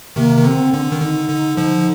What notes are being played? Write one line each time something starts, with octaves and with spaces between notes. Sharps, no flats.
C3 D#3 A#3
D#3
D3 C4
D3 D4
D#3
D3 D#4
D3
D3 F3